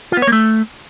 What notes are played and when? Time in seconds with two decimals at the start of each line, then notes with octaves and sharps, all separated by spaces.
0.12 F4
0.17 B3
0.22 C#5
0.27 A#3
0.33 A3